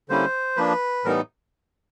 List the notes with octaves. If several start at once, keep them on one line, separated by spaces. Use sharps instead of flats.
D3 G3 A#3 C#4 E4 C5
F3 A#3 D4 B4
A2 E3 G3 B3 D#4 A#4